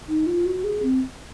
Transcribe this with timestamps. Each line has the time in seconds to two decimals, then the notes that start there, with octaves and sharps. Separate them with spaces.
0.08 D#4
0.26 F4
0.46 F#4
0.64 G#4
0.83 C4